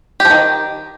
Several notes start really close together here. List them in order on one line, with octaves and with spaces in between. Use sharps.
G4 F3 D#3